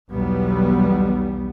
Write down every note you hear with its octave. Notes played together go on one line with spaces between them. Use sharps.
B1 E2 G3 B3